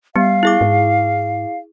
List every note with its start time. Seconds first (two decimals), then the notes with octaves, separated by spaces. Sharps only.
0.16 G3 B3 F5
0.43 E4 G#4 D6
0.61 G#2